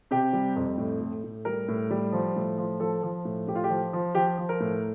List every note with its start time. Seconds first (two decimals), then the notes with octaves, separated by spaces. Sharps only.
0.11 C3 G4
0.33 G3
0.56 F2
0.78 A2
1.01 A2
1.24 A2
1.45 G3 A#4
1.68 A2
1.91 G3
2.13 F3
2.36 A2
2.58 F3
2.80 F3 A4
3.03 F3
3.25 A2
3.47 A2 G4
3.55 F4
3.64 G4
3.70 F3
3.93 F3
4.15 F3 G4
4.38 F3
4.49 A#4
4.60 A2